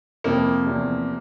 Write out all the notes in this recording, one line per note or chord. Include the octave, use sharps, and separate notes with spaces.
F2 C3 F3 A#3
E2 C3 F3